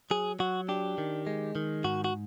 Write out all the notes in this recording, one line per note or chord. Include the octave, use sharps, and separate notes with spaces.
F#3 G#4
F#3 F#4
D4 G4
D#3
G#3
D#3
G#2 F#4
F#4